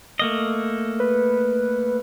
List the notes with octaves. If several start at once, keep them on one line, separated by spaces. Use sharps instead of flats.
A3 A#3 D#5
B4